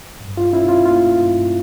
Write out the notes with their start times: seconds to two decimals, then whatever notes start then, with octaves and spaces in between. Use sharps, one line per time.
0.20 G2
0.37 F4
0.53 C#4 E4
0.69 F4
0.85 A#3 F4
1.18 G2